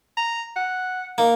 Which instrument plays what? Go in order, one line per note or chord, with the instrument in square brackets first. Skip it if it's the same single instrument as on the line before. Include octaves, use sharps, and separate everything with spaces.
[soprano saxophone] A#5
F#5
[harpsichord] A#3 [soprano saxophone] D#4